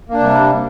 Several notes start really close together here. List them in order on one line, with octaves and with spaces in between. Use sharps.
A#3 D4 C3 G3